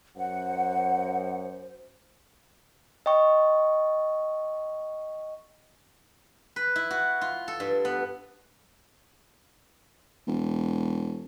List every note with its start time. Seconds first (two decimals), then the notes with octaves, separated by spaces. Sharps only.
0.17 F#2 C5 F#5
3.06 D#5 G5 C#6
6.56 B4
6.76 E4
6.91 F#4
7.21 F4
7.48 A4
7.60 G2
7.85 B3
10.27 E1